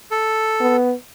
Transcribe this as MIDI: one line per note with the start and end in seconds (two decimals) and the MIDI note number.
0.11 0.77 69
0.60 0.93 59